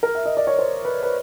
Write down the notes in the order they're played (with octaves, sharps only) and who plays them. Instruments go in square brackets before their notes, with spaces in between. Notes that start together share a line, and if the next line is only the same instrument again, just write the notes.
[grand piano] A#4
E5
D#5
D5
C#5
C5
B4
B4